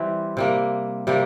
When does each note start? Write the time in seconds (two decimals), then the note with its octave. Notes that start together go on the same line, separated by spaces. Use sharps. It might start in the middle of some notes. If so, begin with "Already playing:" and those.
Already playing: E3 G3 C4 E4
0.37 C3 G3 A#3
1.07 C3 G3 A#3